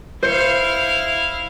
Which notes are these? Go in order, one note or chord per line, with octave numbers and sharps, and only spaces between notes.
E4 C5 F5 C#7